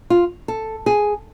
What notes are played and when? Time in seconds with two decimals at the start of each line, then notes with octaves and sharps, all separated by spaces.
0.10 F4
0.48 A4
0.86 G#4